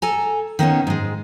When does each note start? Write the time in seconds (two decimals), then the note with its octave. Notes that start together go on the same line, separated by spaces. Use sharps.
0.02 A4 G#5 A#5
0.59 D#3 A#3 B3 C#4
0.87 G#2 G#3